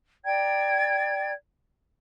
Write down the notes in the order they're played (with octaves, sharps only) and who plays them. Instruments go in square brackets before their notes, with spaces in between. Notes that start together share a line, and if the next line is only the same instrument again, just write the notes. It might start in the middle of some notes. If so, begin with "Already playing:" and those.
[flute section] D5 G5 A#5 G#6